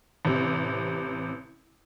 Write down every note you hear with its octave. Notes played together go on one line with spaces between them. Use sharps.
A1 C3